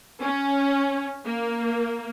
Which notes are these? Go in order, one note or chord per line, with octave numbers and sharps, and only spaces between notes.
C#4
A#3